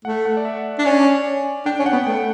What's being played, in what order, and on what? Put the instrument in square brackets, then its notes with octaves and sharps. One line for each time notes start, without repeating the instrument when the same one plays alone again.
[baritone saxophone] A3 [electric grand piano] F#5
[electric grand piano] F#5
D5
E5
[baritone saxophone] D4
[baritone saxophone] C#4 [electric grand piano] D5
[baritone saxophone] D4 [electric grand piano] G5
[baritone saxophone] C#4
[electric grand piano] F#5
[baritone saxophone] B3
[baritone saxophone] A3 [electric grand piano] G5